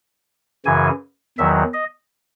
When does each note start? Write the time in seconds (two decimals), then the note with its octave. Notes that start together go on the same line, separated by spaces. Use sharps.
0.65 F#2 C#3 E3 G#5
1.38 E2 D#3 F#3 E5
1.74 D#5